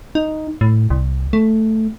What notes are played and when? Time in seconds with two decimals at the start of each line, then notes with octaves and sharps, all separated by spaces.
0.15 D#4
0.61 A2
0.90 C2
1.33 A3